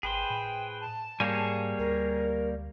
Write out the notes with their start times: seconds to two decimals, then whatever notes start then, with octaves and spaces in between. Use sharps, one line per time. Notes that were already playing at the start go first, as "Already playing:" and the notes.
0.03 G#1 G#4 B4 C5 G5
0.30 A2
0.81 A5
1.20 G#2 G3 A#3 G#4 C#5 G#5
1.79 D2 A#4